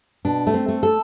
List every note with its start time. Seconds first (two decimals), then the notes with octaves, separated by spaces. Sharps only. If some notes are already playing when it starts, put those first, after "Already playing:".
0.25 B2 D4
0.47 A3
0.54 C4
0.68 A3
0.83 A4